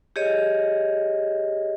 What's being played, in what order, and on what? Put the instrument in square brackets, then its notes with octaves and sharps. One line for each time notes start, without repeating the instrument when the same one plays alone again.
[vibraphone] G4 G#4 C#5 D#5